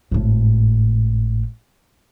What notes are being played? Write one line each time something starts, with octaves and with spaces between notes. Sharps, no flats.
G#1 A2